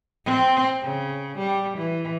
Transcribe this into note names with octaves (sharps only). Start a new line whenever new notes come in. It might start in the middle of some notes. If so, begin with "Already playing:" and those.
C4
C#3
G3
E3